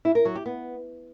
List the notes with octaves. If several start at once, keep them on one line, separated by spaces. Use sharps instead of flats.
E4
A#4
F#3
G4
B3